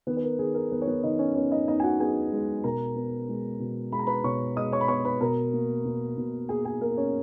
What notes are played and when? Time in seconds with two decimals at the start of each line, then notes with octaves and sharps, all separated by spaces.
0.07 D#3 B3 B4
0.17 B4
0.23 A#4
0.39 D#3 G#4
0.55 A#4
0.72 D#3 B3 B4
0.82 C#5
0.87 B3 B4
1.03 D#3 D#4 D#5
1.19 C#4 C#5
1.35 B3 C#4 C#5
1.51 D#4 D#5
1.68 B3 D#4 D#5
1.80 G#5
1.83 F#4 F#5
1.99 B3 G#4 G#5
2.32 G#3
2.64 B2 A#4 A#5
2.96 B3
3.29 G#3
3.60 B2
3.92 G#3 B5
3.99 A#5
4.07 B4 B5
4.24 B2 C#5 C#6
4.56 G#3 D#5 D#6
4.72 C#5 C#6
4.81 B5
4.88 B3 C#5 C#6
5.05 B4 B5
5.20 B2 A#4 A#5
5.53 A#3
5.85 B2
6.17 B2
6.49 A#3 G#4 G#5
6.65 G#4 G#5
6.81 A#3 A#4
6.97 C#4 C#5